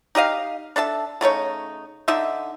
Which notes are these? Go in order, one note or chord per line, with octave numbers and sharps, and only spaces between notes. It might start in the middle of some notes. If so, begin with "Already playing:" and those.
D#4 G4 D#5 F5
D4 A4 E5 A5
C#3 A3 D#4 C#5
D3 D#4 E5